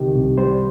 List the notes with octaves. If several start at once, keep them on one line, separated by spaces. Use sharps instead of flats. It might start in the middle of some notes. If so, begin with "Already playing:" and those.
Already playing: C2 C3 D#3 G4
C2
G3 C5